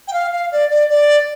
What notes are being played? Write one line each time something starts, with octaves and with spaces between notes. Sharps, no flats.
G5
F5
F5
D5
D5
D5